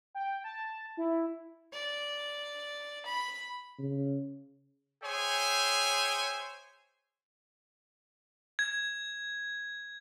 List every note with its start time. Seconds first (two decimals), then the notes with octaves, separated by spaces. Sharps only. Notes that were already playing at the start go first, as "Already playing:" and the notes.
0.15 G5
0.44 A5
0.97 E4
1.73 D5
3.05 B5
3.79 C#3
5.03 G#4 C5 C#5 E5 G5 G#5
8.59 G#6